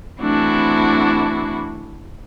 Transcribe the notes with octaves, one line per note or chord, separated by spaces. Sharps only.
E3 A3 C4 D4 E4 F#4